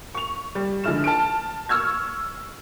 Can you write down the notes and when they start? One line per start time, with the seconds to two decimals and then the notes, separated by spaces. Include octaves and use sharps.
0.15 C#6 F7
0.55 G3
0.84 D3 F3 G#3 E4 F6 E7
1.04 A5 F6 D7
1.69 C#6 E6 F6 G#6